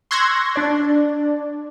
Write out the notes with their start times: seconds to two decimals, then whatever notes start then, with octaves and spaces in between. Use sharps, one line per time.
0.11 C6 C#6 E6 F#6 G#6 A#6
0.56 D4 D5